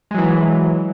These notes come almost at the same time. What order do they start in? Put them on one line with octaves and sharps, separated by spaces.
G#3 F#3 E3